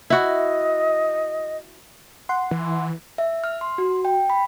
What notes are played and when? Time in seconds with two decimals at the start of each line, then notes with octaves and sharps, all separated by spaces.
0.10 E4 F#4 D#5
2.29 F#5 C6
2.51 E3
3.18 E5
3.44 F6
3.61 C6
3.78 F#4
4.05 G5
4.30 B5